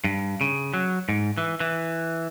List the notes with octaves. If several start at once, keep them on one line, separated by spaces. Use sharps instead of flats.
G2
C#3
F#3
G#2
E3
E3